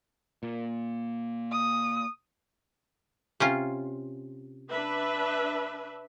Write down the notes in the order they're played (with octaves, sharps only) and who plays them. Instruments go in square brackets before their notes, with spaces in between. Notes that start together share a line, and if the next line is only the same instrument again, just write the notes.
[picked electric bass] A#2
[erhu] D#6
[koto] C3 C#4 F4
[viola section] D4 B4 E5